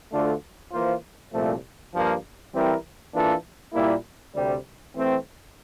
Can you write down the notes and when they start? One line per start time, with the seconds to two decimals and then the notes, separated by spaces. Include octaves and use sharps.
0.12 D2 D3 A3 D4 F4
0.73 E3 A#3 F4 C5
1.32 C2 A#2 F3 A3 C4
1.93 G2 F3 A#3
2.53 E3 G3 C4 E4 A#4
3.13 E3 A#3 D4 F4 A4
3.73 A#2 G3 A#3 E4
4.33 D2 C3 G3
4.94 E3 A3 C4